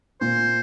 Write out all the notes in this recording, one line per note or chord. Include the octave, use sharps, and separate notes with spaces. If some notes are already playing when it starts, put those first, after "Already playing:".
A#2 C5